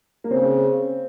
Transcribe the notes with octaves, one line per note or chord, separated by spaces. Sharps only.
A#3
C#3 C4